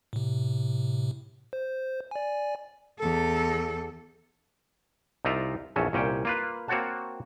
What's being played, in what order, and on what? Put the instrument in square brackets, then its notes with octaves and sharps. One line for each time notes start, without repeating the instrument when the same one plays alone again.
[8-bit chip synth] A2 C3
C5
D5 G#5
[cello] E2 A4
[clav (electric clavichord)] C2 D#4 F4 D5 E5 A#5
A#1 E2 C#4 A4
C2 A#2 C#4 G5
A#3 F4 B4
A#3 C4 F#4 C#5 F#5 A5